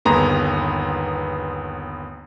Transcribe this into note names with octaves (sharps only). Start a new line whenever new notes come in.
G1 D#2 B3 G#4 A#5 C6